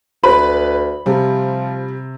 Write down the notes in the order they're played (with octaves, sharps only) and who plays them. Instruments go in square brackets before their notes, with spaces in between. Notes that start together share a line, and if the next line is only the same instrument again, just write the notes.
[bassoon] D2 [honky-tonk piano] B4 [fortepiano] B5
[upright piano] C3 [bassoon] F3 [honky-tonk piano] G3